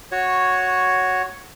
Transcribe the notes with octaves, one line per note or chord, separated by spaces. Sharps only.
F#4 C#5